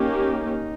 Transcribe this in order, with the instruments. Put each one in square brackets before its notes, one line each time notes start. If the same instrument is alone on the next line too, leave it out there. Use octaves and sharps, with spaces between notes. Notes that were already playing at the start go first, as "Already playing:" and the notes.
Already playing: [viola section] A#3 C#4 G4 [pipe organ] D#4